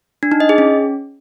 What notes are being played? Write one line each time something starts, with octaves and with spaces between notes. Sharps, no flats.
D4
D#4
D#5
G#4
C#4